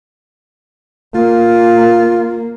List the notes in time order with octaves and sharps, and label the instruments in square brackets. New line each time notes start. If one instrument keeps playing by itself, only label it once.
[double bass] A#3 [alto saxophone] F4